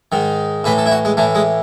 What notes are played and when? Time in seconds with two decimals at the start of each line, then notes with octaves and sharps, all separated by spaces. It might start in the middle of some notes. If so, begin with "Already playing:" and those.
0.12 G#2 D#3
0.64 A2 E3 B4
0.78 A4
0.86 E4
0.92 F#4
1.05 G#3
1.17 A2 E3 A3
1.35 G#3